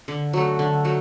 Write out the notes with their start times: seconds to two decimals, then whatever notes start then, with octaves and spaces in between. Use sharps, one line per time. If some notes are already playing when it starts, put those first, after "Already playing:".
0.08 D3
0.33 F#3 A3
0.59 D3
0.85 F#3 A3